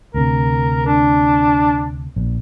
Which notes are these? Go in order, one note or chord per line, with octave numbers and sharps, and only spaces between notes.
D2 C3 A#4
D4
A#1